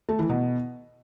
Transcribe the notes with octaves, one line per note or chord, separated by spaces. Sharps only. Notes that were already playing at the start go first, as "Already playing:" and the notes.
A3
E3
B2